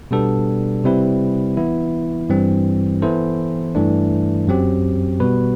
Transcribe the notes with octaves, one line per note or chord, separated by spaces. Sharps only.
B2 G3 B3 D4 A4
C3 G3 C4 E4 B4
E3 B3 E4
G2 E3 G3 C4
E3 B3 E4 A4 C5
G2 E3 A3 D4
F#2 F#3 C4 G4
B2 G3 B3 F#4 B4